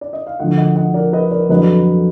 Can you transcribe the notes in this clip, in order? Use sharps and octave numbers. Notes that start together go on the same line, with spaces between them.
D5
D#5
F5
D2 D3 F3 D#5 F#5
D#5 F#5
D#5 F#5
A#4 D5
B4 D#5
A#4 D5
F2 D3 F#3 B4 D#5